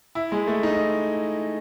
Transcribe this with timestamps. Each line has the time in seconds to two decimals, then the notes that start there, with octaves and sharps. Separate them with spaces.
0.15 E4
0.32 G#3
0.48 A3
0.63 D#4